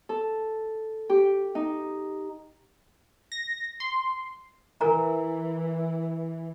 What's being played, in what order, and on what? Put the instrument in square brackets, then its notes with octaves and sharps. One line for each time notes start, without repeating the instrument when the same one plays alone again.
[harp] A4
G4
D#4
[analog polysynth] A#6
C6
[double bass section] E3 [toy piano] A#4 G#5 A#5